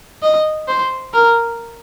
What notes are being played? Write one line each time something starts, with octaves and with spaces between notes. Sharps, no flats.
D#5
C5
A#4